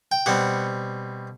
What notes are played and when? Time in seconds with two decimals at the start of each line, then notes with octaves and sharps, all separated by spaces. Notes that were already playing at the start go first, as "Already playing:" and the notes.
0.12 G5
0.26 B2 G3 C4 F#5